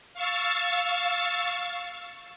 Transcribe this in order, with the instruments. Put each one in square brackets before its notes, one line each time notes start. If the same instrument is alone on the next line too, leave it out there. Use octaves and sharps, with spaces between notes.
[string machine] F5 C#6 E6 A6